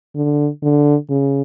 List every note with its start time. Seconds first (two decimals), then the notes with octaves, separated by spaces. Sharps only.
0.16 D3
0.63 D3
1.10 C#3